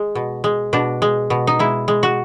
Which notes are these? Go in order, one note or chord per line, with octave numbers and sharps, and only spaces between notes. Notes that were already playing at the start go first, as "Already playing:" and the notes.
Already playing: G#3
B2
G#3
B2 D4
G#3
B2
D#4
G#3 E4
G#3
F#4